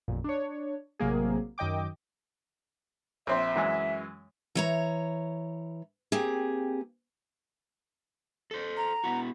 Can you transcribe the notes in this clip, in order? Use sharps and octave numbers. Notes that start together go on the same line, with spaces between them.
A1 F2 A#2
D4 C#5
A1 C3 F#3 A#3 G#4
F#2 D#3 D#5 G5 D6
A#1 C4 C5 E5
F#2 E3 G#3
E3 C#5 A#5
A#3 C4 G4 G#4
A4 C5
A#5
B3 E4 F#4